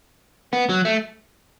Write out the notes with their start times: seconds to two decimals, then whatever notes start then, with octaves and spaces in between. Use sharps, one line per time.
0.53 B3
0.69 F#3
0.85 A3